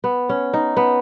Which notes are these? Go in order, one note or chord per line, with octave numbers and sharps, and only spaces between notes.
B3
C#4
D#4
B3